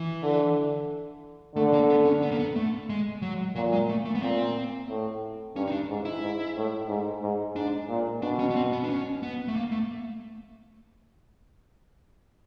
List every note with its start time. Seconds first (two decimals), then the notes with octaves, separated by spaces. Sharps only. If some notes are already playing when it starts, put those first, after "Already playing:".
Already playing: E3
0.23 D3
1.56 D3 A3
1.73 A#3
1.90 B3
2.05 C#4
2.22 B3
2.31 A#3
2.39 B3
2.56 A3
2.90 G#3
3.22 F#3
3.56 A#2 F#3
3.72 G#3
3.89 A3
4.05 A3
4.15 B3
4.22 A#2 C4
4.89 A2
5.56 G2 C#4
5.68 D#4
5.72 D4
5.89 G#2
6.05 E4
6.22 G#2
6.56 A2
6.89 G#2
7.22 G#2
7.56 G#2 D4
7.89 A#2
8.22 B2 D4
8.39 C#4
8.50 B3
8.56 C4
8.73 B3
8.84 D4
8.89 C#4
9.23 B3
9.48 A3
9.56 A#3
9.72 A3